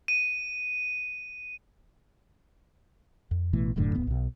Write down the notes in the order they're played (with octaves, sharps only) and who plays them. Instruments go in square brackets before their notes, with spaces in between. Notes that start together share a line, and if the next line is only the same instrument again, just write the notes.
[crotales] D#7
[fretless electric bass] F2
A1 B2 E3 A3
E1 F#2 A2 D3
D1 A2 B3
B1 B2